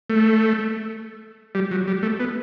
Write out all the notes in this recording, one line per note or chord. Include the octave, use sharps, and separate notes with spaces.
A3
G3
F#3
G3
A3
B3